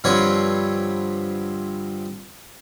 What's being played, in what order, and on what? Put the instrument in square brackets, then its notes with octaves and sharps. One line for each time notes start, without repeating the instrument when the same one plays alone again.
[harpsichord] G2 D3 F3 C4 B4 C#5